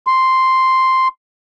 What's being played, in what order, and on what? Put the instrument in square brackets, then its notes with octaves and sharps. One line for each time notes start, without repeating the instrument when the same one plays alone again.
[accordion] C6